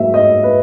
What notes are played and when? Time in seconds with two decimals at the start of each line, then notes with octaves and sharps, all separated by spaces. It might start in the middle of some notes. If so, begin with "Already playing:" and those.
Already playing: G#2 F#3 A#3 E5
0.14 D#5
0.43 B4